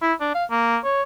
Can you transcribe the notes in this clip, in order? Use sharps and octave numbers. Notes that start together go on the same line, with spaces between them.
E4
D4
F5
A#3
C#5